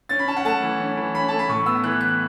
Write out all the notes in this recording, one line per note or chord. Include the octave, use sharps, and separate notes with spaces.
C#4 A6
B5
C#4 A5
F#5
A3 A5
E3
C#4
E3
C#4 B5
A3 A5
B5
A2 C#6
B3 E6
E3 F#6
E3 F#6